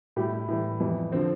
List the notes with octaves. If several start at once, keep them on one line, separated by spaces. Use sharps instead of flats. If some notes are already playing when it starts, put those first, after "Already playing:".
A2 G3 G4
E4
A2 E3 G3
F2 E3 G3
D3 F3 C4